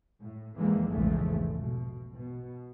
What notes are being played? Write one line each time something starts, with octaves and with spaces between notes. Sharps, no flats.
A2
F2 D3 E3 G#3 A#3
A#1 E2 G#2 C#3 G#3 A3
B2
B2